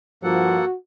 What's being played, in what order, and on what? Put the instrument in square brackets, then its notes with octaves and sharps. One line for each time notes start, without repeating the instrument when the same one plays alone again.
[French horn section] G2 F3 [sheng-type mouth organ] A#3 A4 F#5 [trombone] F#4